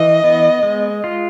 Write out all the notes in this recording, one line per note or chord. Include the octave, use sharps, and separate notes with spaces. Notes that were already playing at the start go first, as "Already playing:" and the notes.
Already playing: E3 D#5
B3
G#3
F4